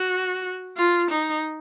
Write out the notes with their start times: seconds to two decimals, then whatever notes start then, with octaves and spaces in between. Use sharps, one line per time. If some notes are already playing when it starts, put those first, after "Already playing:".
Already playing: F#4
0.77 F4
1.10 D#4